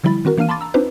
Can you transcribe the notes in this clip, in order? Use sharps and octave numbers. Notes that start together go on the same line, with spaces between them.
D3 F3 G3 E4 B5 A6
D#3 C4 F#4 A#4
E3 A#3 D4 F5 F6 D#7
A5 B5 C6 D6 A6
A#5 E6
C4 D4 D#4 F4 B4 C5